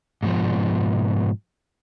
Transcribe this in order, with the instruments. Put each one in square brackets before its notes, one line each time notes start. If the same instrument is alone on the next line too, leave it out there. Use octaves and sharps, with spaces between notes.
[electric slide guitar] G#2 B2 F3